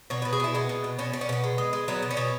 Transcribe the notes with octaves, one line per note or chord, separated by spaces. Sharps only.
B2 C#5
B2 B4
G#4
B2 E4
G#3 B3
B2
B2
B2 C#4
B2
C#4
B2 B3
G#3
G#3
G#3
F#3 B3
B2
C#4
B2